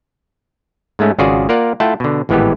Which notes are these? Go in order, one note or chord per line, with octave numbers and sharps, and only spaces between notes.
G#2 G#3 A3 C#4
G#1 C#3 F4 F#4 G#4 D5
A#3 F4 A#4 D5 F#5
A3 E4 F4 F#5 G5 A5
B2 D3
G#1 A2 E3 G#3 B3 G4